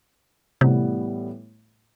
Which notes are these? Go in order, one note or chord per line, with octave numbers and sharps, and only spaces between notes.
A2 C3 E3 G3 B3